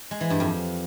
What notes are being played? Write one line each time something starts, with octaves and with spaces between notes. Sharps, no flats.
G#3
E3
G2
F2